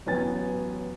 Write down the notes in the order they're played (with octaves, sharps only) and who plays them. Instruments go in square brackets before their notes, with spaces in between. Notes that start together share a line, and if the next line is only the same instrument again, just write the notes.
[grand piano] A1 F#3 B3 G5 G#5 A6